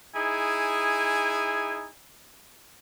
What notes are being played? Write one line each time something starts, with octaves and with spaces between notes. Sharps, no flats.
D#4 E4 G#4 G#5